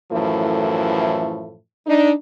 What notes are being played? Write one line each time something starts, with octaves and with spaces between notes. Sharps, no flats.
F#2 A2 E3 F3 A3 E4
D4 D#4